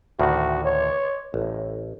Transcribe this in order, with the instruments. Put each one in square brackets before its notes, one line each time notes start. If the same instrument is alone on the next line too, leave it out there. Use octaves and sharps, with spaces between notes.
[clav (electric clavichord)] D2 A2 D#3 [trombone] F#4
[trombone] C#5
[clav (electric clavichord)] A1 [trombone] A2